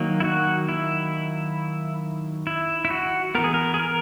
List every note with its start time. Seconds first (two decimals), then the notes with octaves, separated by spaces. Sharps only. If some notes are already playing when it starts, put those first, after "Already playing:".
Already playing: D#3 F#3 A#3
0.20 E4
0.24 F#4
0.69 E4
2.47 E4
2.85 E4
2.90 F#4
3.35 E3 B3 A#4
3.44 G#4
3.54 A#4
3.74 G#4
3.80 A#4